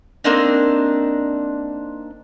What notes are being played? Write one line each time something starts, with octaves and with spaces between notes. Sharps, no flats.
A#3 C4 D4 D#4